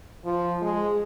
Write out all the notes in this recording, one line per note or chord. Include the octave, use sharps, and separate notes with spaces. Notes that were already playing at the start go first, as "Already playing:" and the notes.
F3
G#3